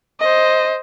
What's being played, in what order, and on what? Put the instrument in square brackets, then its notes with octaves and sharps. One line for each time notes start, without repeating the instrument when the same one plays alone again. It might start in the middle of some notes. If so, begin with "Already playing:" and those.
[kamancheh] C5 D#5